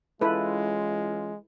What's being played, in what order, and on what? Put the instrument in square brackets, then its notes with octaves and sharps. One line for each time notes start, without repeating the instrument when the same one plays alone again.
[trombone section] E3 C#4 F4 [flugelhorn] G#3 [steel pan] E4 A4 B4